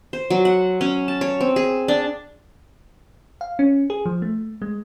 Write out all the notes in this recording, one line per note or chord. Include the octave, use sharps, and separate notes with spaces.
C5
F#3
F#5
C#4
A5
C#5
C4
G#4
D4
F5
C#4
G#4
F3
A3
G#3